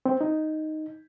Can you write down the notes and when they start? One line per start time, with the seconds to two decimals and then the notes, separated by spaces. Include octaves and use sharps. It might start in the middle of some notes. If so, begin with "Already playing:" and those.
0.06 C4
0.21 D#4